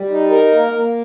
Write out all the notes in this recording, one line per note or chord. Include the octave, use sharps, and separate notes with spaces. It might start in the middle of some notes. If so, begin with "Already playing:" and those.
Already playing: G3
D#4
A#4
A#3
A#3